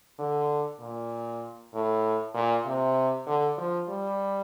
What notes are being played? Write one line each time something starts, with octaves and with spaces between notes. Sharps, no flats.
D3
A#2
A2
A#2
C3
D3
F3
G3